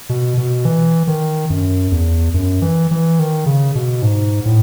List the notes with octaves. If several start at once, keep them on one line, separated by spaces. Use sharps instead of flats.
B2
B2
E3
D#3
F#2
E2
F#2
E3
E3
D#3
C#3
B2
G#2
A2